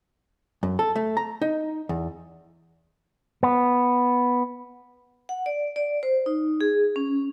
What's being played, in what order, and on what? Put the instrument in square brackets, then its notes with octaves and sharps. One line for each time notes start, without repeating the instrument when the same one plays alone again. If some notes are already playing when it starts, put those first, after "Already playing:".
[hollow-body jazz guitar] F#2
A4
A3
A#5
D#4
E2
[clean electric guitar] B3
[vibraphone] F#5
D5
D5
C5
D#4
G#4
C#4